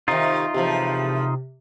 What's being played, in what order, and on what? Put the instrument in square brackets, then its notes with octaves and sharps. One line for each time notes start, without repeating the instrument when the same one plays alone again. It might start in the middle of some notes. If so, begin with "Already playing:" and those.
[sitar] C3 D#3 [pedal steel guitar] D#4 F4
[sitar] E2 A2 F3 [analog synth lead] C3